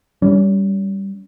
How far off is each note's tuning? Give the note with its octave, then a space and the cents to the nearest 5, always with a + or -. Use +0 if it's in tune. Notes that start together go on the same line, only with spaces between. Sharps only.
G3 +0 C#4 +35